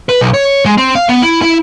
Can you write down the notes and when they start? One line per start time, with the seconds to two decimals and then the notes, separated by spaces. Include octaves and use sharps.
0.09 B4
0.21 B1
0.34 C#5
0.66 G#3
0.78 C4
0.95 F5
1.09 B3
1.22 E4
1.42 E4